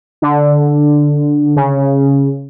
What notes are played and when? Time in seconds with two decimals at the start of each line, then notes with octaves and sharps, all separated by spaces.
0.22 D3
1.56 C#3